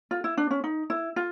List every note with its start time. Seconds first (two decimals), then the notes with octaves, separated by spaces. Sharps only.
0.11 F4
0.24 E4
0.37 D4
0.51 C#4
0.64 D#4
0.90 E4
1.16 F4